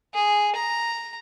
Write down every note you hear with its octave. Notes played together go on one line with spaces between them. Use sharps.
G#4
A#5